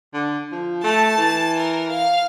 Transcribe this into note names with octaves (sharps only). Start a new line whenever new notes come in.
D3
F3
A3 A5
E3
A#4
F5